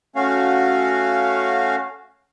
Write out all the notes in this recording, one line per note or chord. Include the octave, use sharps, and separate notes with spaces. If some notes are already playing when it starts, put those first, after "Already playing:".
A3 C#4 F#4 F5